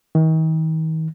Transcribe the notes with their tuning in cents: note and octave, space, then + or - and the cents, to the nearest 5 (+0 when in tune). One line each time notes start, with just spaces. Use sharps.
D#3 +40